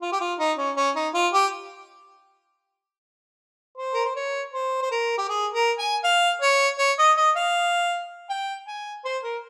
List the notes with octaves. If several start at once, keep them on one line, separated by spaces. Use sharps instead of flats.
F4
G4
F4
D#4
C#4
C#4
D#4
F4
G4
C5
A#4
C5
C#5
C5
C5
A#4
G4
G#4
A#4
G#5
F5
C#5
C#5
D#5
D#5
F5
G5
G#5
C5
A#4